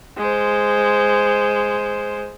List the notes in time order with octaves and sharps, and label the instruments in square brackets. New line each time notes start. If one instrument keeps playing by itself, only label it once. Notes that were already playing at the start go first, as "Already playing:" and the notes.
[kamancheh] G#3 C5